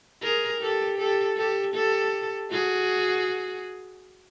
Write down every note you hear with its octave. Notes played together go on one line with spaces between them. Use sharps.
G#4 A#4
G4 A4
G4 A4
G4 A4
G4 A4
F#4 G#4